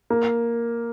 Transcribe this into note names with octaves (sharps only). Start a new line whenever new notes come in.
A#3